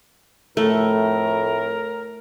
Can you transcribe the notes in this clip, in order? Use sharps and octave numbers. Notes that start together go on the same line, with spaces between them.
F2 A2 A3 A#4